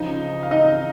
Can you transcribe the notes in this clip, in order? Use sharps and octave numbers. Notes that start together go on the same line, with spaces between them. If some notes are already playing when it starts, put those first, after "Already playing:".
Already playing: C#2 C#3 F3 D#4 D#5
F5
D#4 D#5